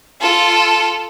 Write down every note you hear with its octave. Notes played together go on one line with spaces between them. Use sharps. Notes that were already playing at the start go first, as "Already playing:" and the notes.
F4 A4